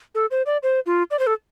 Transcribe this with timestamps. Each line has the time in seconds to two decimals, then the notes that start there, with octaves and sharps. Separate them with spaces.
0.15 A4
0.31 C5
0.46 D5
0.63 C5
0.86 F4
1.11 D5
1.19 C5
1.27 A4